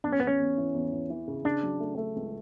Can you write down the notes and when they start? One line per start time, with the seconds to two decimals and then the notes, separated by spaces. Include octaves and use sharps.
0.04 E2 D4
0.12 C#4
0.20 E2 B3
0.27 C#4
0.40 E2
0.57 E3
0.75 E2
0.92 E3
1.10 E3
1.28 C#3
1.45 C#3 D4
1.63 F#3
1.80 A3
1.97 A3
2.16 C#2